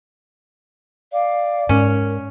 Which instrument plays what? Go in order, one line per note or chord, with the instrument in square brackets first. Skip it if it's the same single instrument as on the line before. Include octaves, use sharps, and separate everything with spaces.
[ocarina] D5 [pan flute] F5
[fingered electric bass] G#2 [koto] C#4 [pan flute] A#4